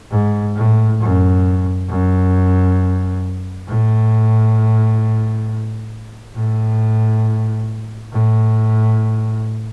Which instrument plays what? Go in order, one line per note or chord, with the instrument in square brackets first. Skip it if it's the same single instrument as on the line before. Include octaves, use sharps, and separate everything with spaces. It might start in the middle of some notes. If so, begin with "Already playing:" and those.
[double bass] G#2
A2
F#2
F#2
A2
A2
A2